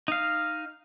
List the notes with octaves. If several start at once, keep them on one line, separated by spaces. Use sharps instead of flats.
D#4 F5